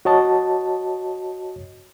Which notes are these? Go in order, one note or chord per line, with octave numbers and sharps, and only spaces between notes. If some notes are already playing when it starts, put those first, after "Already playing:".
F#4 C#5 D#5 A5